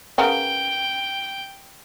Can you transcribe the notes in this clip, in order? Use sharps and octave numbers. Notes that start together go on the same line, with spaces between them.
C#3 B3 A#4 G5